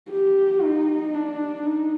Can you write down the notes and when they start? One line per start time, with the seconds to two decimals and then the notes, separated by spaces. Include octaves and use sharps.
0.10 G4
0.62 D#4
1.14 D4
1.66 D#4